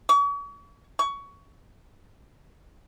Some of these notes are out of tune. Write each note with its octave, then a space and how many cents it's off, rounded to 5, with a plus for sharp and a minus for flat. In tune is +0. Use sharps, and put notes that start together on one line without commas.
C#6 +40
C#6 +20